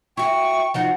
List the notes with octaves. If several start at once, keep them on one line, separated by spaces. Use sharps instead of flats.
E4 F#4 G5 C#6
F3 D#4 F#4 F#5